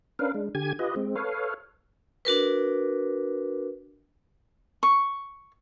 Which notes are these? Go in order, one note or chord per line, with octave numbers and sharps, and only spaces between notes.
C#4 D4 A#4 B4 F5
G#3 D4
D3 G4 G#5 G#6
F4 G4 B4 D#5
G#3 C4
A4 B4 C#5 F5
D4 F#4 A#4 B4
C#6